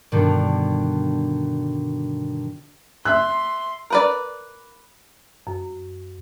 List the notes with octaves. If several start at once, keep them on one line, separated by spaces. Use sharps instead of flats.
G2 B2 D3 D#3
E5 C6 E6 F#6
A#4 B4 D5
F#2